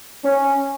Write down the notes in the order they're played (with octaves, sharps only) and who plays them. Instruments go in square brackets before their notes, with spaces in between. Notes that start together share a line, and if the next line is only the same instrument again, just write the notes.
[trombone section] C#4